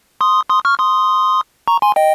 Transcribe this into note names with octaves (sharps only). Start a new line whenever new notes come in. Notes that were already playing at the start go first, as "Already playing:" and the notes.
C6 D#6
C6 D#6
C#6 F6
C6 D#6
A#5 C#6
G#5 C6
D#5 G5